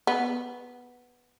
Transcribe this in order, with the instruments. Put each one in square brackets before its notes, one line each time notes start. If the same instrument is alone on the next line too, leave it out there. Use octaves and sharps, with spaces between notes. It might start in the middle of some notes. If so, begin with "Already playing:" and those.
[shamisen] B3